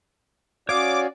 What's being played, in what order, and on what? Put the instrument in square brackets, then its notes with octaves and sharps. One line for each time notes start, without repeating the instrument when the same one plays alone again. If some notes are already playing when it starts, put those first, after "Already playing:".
[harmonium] C#4 F#4 D5 [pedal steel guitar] C#5 F5 D#6 [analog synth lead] D6